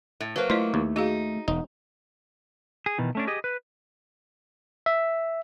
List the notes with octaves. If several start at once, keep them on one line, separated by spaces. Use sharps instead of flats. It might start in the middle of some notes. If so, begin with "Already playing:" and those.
A2
F#3 A#3 B4 C5
A3 E4 F4 C5 D#5
D#2
D#4 F#4 G#4 F5
E1 D#4
G#4
B2 D#3 E3
A3 C#4 D4
G4 G#4 D#5
B4
E5